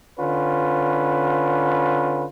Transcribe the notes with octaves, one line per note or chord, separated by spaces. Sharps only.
D3 C#4 F4 B4